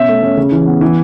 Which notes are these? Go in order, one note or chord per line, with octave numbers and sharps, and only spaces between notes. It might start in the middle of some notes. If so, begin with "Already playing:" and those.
Already playing: B2 C#4 E5
A3
C#4
C#3
E3
B3
E3